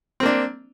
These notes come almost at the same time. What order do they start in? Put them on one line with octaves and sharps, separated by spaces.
C4 A#3 D4